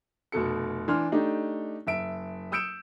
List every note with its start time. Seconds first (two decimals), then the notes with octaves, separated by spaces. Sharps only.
0.32 F1 B2 A4 C#7
0.88 E3 D4 C6 F6
1.12 A3 D4 D#4 G4
1.87 F#1 E5 D7
2.52 D#6 E6 G6 C#7 D7 E7